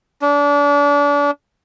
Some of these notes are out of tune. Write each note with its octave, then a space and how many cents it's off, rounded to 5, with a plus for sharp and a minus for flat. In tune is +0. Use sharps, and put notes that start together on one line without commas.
D4 -35